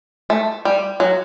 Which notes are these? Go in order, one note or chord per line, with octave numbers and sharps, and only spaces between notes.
A3
G3
F#3